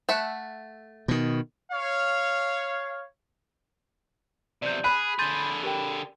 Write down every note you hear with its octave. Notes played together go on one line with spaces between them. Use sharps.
A3 E5 F#5
B2 D#3
C#5 F5
E2 C3 D5 G6
G#4 B5 F#6
D3 G#4 C6 G6 A6
G4 A#4 G5